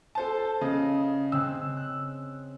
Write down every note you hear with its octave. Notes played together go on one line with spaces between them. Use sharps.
A4 C5 A5
C#3 D#5
C#3 C4 E6 F#6
F#6